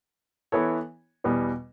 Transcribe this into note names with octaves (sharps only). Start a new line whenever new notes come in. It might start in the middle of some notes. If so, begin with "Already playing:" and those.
E3 B3 E4 A4 C#5
E2 B2 G3 B3